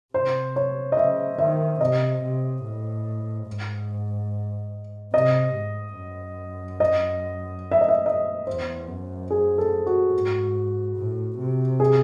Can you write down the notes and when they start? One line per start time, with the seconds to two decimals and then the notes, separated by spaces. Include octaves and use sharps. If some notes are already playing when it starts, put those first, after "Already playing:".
0.14 C3 C5
0.56 C#5
0.92 D#5
0.97 C#3 E5
1.39 D#3 E5
1.81 C3 D#5
2.22 C3
2.64 A2
3.47 G#2
5.13 C3 D#5
5.55 G#2
5.97 F#2
6.80 D#5
7.71 E5
7.81 D#5
7.88 E5
8.06 D#5
8.47 E2 C5
8.88 F#2
9.30 G#4
9.58 A4
9.86 F#4
10.13 G#2
10.97 A2
11.39 C3
11.80 G#4